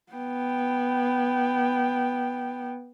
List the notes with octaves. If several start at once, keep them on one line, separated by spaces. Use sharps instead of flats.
B3 G5